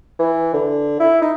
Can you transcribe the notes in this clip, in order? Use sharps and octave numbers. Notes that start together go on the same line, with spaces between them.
E3
D3
E4
D#4